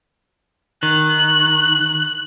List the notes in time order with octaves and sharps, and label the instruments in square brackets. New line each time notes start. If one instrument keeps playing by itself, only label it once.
[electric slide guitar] D#3 [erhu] F#6